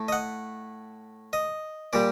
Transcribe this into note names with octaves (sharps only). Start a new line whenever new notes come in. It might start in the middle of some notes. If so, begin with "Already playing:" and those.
Already playing: A2 A3
D#5
F#5
D#5
A#2 G3 D5